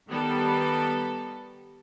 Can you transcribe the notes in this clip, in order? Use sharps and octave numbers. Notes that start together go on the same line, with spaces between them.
D#3 G3 B3 A4